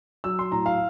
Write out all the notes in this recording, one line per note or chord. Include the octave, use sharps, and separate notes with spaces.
F#3 E6
C6
A2 A#5
F5